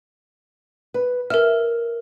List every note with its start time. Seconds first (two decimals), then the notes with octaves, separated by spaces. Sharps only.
0.94 B4
1.30 A#4 E5 F6